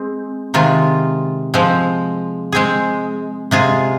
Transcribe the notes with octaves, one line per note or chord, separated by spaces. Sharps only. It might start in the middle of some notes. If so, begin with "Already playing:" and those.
Already playing: G#3 C4 G#4
C3 D#3 G#3 F4
F3 G#3 C4
G#3 C4 G#4
C3 G#3 F4 G#4